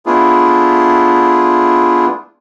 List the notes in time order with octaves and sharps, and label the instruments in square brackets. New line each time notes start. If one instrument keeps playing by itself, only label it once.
[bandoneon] A3 B3 D4 E4 F4 G#4